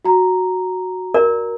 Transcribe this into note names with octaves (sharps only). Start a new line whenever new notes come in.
F#4 A#5
A#4 D5